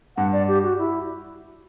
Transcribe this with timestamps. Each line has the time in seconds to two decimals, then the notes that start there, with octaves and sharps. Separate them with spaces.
0.17 G2 F#5
0.33 D5
0.48 G4
0.63 F#4
0.78 E4